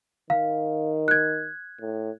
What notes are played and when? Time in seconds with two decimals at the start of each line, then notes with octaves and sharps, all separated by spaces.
0.30 D#3 F5
1.08 F#6 G#6
1.81 A2